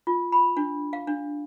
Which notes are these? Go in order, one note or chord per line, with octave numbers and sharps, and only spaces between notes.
F4
B5
D4
F5
D4